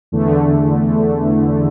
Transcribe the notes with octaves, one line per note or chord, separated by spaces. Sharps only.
E2 D3 A3